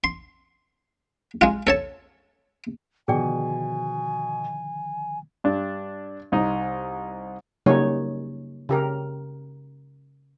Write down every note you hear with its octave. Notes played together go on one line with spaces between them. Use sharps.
C6
G#3 F4
A4 C#5 A5
B2 D3 D#3 F3 G#4 D5 G5 G#5
G2 D4
C2 D#4
C#3 F#3 G3 A#3 D#4 C#5
C#3 G4 A#4